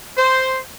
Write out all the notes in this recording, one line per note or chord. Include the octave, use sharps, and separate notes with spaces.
C5